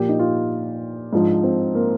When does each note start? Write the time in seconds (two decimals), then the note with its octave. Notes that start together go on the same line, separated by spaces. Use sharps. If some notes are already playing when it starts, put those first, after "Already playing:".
Already playing: A#2 F3 G4
0.09 D#4
0.19 F4
1.13 G#2 F3 D4
1.43 C4
1.75 A#3